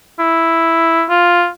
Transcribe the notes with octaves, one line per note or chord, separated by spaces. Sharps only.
E4
F4